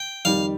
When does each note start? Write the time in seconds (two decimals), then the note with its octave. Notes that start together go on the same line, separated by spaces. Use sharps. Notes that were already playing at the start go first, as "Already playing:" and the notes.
Already playing: G5
0.25 F2 D#3 G3 F5